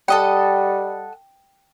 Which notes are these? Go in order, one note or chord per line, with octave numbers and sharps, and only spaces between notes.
G3 A4 D#5 F#5 G5